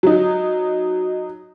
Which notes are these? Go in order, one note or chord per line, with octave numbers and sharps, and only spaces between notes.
F#3 D#4